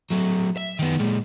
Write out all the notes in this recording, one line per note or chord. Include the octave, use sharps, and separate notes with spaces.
F#3 A3
E5
D#3 B3
A#2 G#3